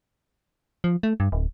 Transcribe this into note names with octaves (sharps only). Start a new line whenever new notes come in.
F3
A3
G2
D1